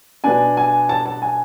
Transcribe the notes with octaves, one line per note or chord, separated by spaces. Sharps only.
B2 B3 D4 G#5
G#5
A5
A5
G#5